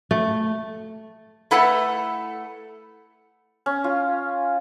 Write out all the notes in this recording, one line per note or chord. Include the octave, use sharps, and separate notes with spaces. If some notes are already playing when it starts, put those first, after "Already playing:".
A3
A3 E4 A4 B4 F#5
C#4
F4